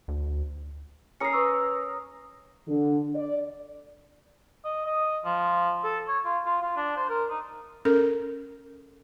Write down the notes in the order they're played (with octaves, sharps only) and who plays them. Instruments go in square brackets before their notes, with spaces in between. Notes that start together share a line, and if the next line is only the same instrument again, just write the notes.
[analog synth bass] D2
[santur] C#4 A#4 D#6 [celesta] C7 C#7
[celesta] B4 C#6 E6
[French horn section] D3
D5
[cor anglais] D#5
D#5
F3
A4
C#5
F4
F4
F4
D4
C5
A#4
D#4
[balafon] C#4 A4 A#4